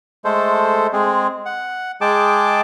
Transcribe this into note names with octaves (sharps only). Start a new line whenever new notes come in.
G#3 A3 A4 C5
G#3 C4 G#4
F#5
G#3 G#4 G5 A5 D6